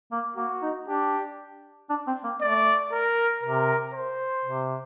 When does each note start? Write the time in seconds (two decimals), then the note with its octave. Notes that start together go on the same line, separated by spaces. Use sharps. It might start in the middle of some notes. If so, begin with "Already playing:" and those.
0.12 A#3
0.36 A#3 F#4
0.62 D#4
0.87 D4 G4
1.90 D4
2.07 C4
2.24 A#3
2.41 A3 D5
2.92 A#4
3.42 C3 A#4
3.94 C5
4.45 C3